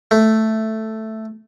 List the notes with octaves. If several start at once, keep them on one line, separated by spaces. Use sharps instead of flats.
A3